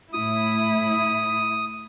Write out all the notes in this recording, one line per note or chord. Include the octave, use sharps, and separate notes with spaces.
A2 E4 D#6